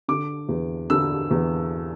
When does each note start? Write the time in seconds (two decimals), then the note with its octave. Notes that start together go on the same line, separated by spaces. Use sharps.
0.08 D3 D6
0.49 E2
0.90 D3 E6
1.31 E2